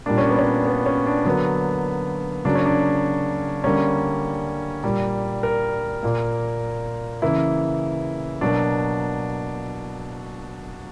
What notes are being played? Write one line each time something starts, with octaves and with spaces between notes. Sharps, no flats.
A#2 G3 A#3 D4
C#4
B3
C#4
B3
C#4
D4
D3 F#3 A#3 B3
C#3 F#3 A#3 D4
C#4
D4
D3 G3 A#3 C#4
A#2 G3 A#3
A#4
A#2 A#3
C#3 E3 A#3 E4
B2 F#3 A#3 D4